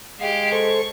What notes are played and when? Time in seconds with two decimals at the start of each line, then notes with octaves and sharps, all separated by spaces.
0.19 G#3 G4 F5
0.52 A4 C5 C#6